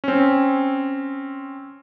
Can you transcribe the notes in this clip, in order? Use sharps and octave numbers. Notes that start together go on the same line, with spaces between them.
C4 C#4